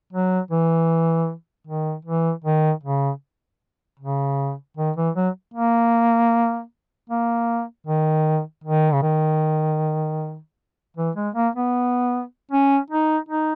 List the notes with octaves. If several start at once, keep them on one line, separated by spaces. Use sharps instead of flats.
F#3
E3
D#3
E3
D#3
C#3
C#3
D#3
E3
F#3
A#3
A#3
D#3
D#3
C#3
D#3
E3
G#3
A#3
B3
C#4
D#4
D#4